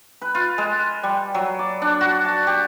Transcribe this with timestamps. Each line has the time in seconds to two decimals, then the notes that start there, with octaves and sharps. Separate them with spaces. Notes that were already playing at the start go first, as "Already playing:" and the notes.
0.22 B4
0.35 F4
0.58 G#3
1.03 G3
1.34 F#3
1.59 D5
1.82 D4
2.01 F#4
2.25 A5
2.47 G4